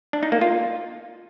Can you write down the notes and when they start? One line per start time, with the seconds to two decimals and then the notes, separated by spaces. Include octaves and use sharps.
0.13 D4
0.23 D#4
0.32 A#3
0.41 F4